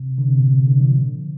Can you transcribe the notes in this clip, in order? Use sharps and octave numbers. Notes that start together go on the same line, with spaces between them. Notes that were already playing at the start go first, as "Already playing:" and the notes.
Already playing: C3
D3
C3
A#2
C3
D3
F3